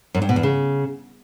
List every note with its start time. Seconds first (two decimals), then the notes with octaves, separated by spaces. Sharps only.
0.15 F#2
0.22 G2
0.29 B2
0.36 E2
0.43 C#3